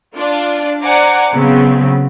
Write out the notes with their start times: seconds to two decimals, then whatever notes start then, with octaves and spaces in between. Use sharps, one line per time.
0.16 D4 F4 D5
0.82 C5 D5 F#5 G#5 A#5 D6
1.33 C#3 F#3 B3 C4